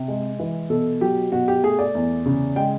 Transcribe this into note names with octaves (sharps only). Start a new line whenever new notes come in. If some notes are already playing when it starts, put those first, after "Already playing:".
Already playing: C3
G#3
E3
B2 A4
F#3 G4
B2 F#4
G4
A3 G#4
D5
E2
C#3
G#3 G5